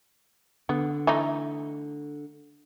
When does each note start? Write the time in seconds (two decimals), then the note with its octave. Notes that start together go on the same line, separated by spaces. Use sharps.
0.69 D3 B3
1.07 E3 A3 D#4